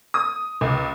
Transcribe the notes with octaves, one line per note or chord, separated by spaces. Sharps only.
D#6
C#2